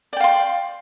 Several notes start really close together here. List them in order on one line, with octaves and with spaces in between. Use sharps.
D5 G5 F5 C6